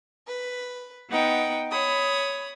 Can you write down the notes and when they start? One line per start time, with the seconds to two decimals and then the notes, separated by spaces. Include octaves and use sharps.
0.28 B4
1.09 B3 D#4 F#5 G5
1.71 C#5 B5 D#6